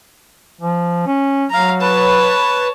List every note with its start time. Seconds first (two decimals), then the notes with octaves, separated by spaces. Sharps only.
0.61 F3
1.07 C#4
1.51 F#3 F5 A#5
1.81 B4 C#5 A5